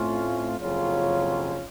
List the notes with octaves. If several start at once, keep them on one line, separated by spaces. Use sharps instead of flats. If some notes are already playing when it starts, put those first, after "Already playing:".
Already playing: A2 A3 C4 C#4 F4
F#1 F2 C#3 F#3 C#4 F4